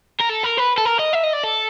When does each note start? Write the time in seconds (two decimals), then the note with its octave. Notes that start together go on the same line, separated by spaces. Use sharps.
0.20 A#4
0.30 A4
0.44 A#4
0.58 B4
0.78 A4
0.85 A#4
0.99 D#5
1.13 E5
1.24 D#5
1.33 D5
1.44 A4